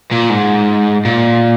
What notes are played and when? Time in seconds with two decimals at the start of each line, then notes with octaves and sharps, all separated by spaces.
0.12 A#2
0.30 G#2
1.05 A#2